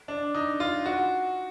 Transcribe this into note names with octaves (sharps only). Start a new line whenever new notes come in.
D4
D#4
F4
F#4